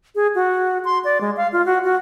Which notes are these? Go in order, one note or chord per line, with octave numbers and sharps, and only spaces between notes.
G#4
F#4
C6
D5
G#3
F5
F4
F#4
F#4